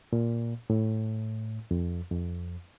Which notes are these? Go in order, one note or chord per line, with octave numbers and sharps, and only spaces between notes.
A#2
A2
F2
F2